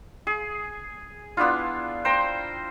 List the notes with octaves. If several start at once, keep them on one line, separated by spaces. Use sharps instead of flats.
G#4
B3 D4 E4 F4
C5 G5 A#5